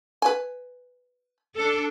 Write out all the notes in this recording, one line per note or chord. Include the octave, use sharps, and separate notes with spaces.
B4 G#5
D4 A4